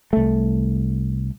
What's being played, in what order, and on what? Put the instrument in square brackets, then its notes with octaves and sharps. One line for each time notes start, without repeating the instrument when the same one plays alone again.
[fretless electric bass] C2 A3